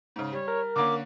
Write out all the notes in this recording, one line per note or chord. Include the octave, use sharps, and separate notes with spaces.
G#2 C#3
G3 C#5
A#4
D3 A#3 C#4 D6